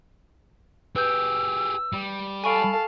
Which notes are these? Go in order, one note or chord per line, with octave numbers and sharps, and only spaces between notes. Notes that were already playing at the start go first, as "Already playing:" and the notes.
G4 G#4 B4 E6 G6
G3
A4 F5 G#5 A5 B5 C#6 D7